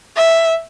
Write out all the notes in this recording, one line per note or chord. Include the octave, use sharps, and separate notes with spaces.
E5